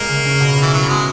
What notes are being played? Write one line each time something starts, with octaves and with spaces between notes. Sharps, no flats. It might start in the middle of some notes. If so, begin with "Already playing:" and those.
Already playing: A#2 G#3 A#3
C#3
C#4
B2
E3 F#4
F#3 E4
B2 G#3